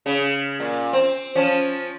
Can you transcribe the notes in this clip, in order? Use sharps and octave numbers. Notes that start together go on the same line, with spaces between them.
C#3
A#2
C4
F3 C#4